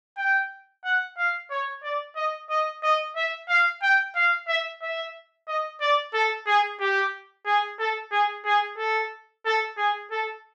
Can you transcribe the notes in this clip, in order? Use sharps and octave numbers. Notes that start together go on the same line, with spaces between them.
G5
F#5
F5
C#5
D5
D#5
D#5
D#5
E5
F5
G5
F5
E5
E5
D#5
D5
A4
G#4
G4
G#4
A4
G#4
G#4
A4
A4
G#4
A4